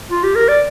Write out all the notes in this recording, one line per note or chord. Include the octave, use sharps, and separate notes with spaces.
F4
G4
A#4
D5